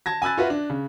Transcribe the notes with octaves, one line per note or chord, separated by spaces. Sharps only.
A5 G#6 A#6
G#5 B5 E6 F#6 A6
F4 F#4 B4 E5
D4
C#3